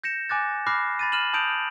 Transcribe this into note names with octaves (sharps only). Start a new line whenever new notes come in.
G6 A#6 C#7 E7
G#5 D6 F#6 A6
B5 D6 F6 F#6 A#6 C7
B5 A6 D#7
F6 D#7 E7 F#7
A5 D#6 G6 D7 F7